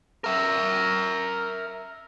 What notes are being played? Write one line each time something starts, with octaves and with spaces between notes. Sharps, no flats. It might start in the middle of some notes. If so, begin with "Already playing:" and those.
A#4 E5